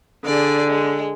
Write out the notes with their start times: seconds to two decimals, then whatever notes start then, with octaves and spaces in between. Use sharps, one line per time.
0.25 D3 G#4 D5
0.68 G#3